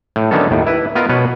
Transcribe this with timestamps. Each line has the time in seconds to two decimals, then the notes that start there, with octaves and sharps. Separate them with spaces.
0.16 A2
0.31 D3 D#3 F#3 B3 C#4 A4
0.51 D#2 A2
0.67 E4 B4
0.95 B3 F4 A#4 D#5
1.09 B2 B4 C#5